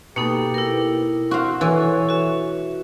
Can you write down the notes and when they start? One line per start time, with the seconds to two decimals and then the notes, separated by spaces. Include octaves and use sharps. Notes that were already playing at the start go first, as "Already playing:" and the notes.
0.16 B2 A#3 D#4 G4 A4
0.54 E4 A#4
1.31 C4 F#4 F5
1.61 E3 A4 C#5
2.09 F#4 E5